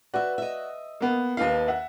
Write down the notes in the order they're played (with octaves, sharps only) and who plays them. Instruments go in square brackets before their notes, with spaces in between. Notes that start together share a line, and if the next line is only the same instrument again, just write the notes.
[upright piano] F#4 D5 [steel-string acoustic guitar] B4 E5
[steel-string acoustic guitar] D#5 E5
[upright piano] A#3 B3
[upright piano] D#2 F5 [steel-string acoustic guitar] D#4 B4 A5
[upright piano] E5 F#5